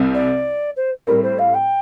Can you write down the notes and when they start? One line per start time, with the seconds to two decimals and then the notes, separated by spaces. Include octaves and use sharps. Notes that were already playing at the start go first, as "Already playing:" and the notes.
Already playing: C2 C3 G3 C4
0.14 D5
0.76 C5
1.07 A2 G3 C4 A#4
1.23 C5
1.39 F5
1.54 G5